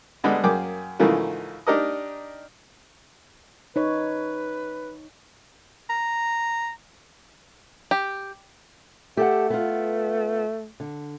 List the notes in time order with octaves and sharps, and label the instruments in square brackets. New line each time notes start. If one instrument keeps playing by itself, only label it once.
[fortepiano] D3 G3 G#3 B3 D4
F#2 A#3 G#4 G5 D6
G#2 C#3 E3 F3 A3 A#3
D4 D#4 G4 A#4 D5 D#5
[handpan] D#4 C#5 [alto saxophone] B4
[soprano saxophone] A#5
[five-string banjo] G4
[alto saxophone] A3 [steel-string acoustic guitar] G4 A4 F#5
[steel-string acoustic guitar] B3 F4
D3